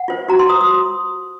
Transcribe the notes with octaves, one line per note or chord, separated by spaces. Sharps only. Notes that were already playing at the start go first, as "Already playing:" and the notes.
Already playing: F#5
F4 C5
F#4 A#5
C6
C5 D#6
D#6